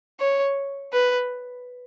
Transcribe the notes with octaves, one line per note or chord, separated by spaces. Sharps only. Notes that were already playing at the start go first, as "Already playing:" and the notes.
C#5
B4